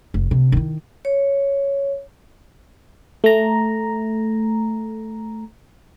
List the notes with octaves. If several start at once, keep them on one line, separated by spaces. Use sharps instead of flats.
F1
C3
D#3 E4
C#5
A3 A#5